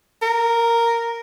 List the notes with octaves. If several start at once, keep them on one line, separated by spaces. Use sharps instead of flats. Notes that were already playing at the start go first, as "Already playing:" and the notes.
A#4